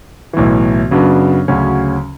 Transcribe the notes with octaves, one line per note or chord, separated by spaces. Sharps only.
B1 A2 E3
F#2 C#3 F#3 B3 D4
D2 C#3 F#3 C#4